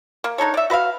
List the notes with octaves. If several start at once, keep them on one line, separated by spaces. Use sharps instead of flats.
A#3
D4 D#4 A4 C#5
D5 E5
F#4 B4 E5 F5